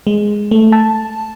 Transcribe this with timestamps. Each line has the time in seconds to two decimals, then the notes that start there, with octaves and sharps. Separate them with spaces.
0.07 G#3
0.51 A3
0.72 A5